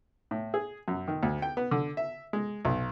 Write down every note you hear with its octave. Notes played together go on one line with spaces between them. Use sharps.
A2
G#4
F#2
D#3
D2
G5
B3
D3
E5
G#3
B1